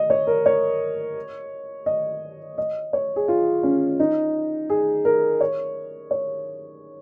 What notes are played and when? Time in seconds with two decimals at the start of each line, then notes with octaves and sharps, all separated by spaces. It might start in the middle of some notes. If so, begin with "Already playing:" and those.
Already playing: D#5
0.10 C#5
0.27 A#4
0.46 C#5
1.86 D#5
2.58 D#5
2.93 C#5
3.16 G#4
3.28 F4
3.63 C#4
4.00 D#4
4.70 G#4
5.05 A#4
5.41 C#5
6.11 C#5